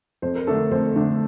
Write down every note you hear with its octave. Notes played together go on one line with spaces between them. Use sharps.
F2 C5
A#4
D3 A3 D4 A4
F2 C5
D3 A3 D4